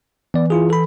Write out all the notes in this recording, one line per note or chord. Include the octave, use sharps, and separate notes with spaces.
E3 B3 D5
E4 F4 G#4
A4 B5